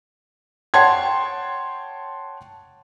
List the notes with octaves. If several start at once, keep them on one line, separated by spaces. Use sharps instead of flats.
C#5 F#5 G5 A5 C6 G#6